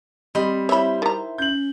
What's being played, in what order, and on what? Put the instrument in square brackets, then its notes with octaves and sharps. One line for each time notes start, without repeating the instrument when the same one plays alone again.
[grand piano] G3 [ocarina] C4 [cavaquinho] D#5 B5 C6
[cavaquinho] E4 C5 E5 [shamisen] C#5 B5
[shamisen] D#3 A#5
[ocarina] C#4 [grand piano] G6 F#7